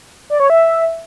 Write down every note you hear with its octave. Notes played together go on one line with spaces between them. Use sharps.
D5
C#5
E5